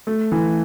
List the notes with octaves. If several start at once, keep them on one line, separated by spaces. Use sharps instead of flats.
A3
E3